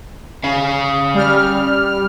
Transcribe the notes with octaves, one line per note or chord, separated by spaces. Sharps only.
C#4 F5
G3 F6